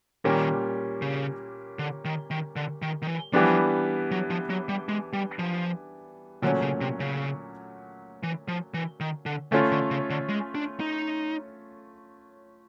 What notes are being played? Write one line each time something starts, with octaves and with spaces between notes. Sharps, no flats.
A#2 D#3 G3 A#3 C#4
C#3
D3
D#3
D#3
D3
D#3
D#3
E3
E3 F3 G3 B3 D4
F#3
F3
F#3
G3
G#3
G3
F3
A#2 D3 F#3 A3 C#4
C#3
C3
C#3
E3
F3
E3
D#3
D3
D3 A3 C#4 F4
D3
C#3
D3
G#3
D4
D#4